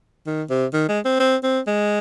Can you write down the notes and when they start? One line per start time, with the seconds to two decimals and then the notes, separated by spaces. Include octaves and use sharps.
0.26 D#3
0.50 C3
0.73 D#3
0.89 G#3
1.05 C4
1.20 C4
1.43 C4
1.67 G#3